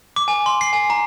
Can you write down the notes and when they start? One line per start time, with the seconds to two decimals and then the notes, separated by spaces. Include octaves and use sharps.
0.16 D6
0.28 G#5
0.46 C6
0.61 C7
0.73 G#5
0.90 A#5